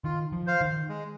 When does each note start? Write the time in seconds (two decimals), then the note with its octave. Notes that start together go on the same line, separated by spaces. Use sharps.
0.04 D#3 F4
0.32 F3
0.47 C5 F5
0.61 D#3
0.89 G#3